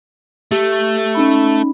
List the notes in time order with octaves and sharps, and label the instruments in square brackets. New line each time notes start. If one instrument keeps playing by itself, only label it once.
[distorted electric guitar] A3 [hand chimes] G4
[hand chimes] C#4 D#4 B5